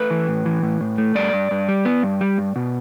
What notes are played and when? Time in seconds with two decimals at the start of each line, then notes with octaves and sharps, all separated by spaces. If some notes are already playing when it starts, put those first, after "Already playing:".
Already playing: A3 B4
0.10 E3
0.28 A2
0.46 E3
0.63 A2
0.81 A2
0.98 A3
1.15 G2 D5
1.33 G2
1.51 G2
1.68 G3
1.85 B3
2.03 G2
2.21 G3
2.38 G2
2.56 B2